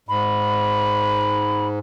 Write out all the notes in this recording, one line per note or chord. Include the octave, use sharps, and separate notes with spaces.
G#2 B5